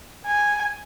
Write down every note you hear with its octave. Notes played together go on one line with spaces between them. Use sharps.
G#5